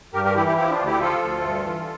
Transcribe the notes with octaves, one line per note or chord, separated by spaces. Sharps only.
G2 G4 A#4
G4 A#4
E3 E4 G4
E4 G4
F3 E4 G4
D4 F4
D2
E4 G4
F3 F4 A4
D2
G2
E3